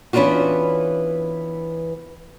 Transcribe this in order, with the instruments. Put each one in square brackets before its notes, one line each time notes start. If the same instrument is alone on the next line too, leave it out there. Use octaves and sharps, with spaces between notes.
[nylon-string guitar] E3 B3 C#4 D4 F4 F#4